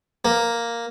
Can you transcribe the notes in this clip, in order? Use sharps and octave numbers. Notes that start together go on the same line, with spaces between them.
A#3